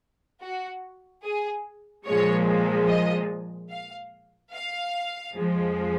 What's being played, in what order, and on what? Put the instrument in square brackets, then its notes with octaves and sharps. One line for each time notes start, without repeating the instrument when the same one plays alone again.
[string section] F#4
G#4
A#2 F3 G#3 C#5
D#5
F5
F5
F2 F3 G#3